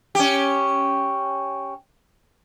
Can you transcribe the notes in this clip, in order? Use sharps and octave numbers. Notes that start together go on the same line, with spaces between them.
C#4 G4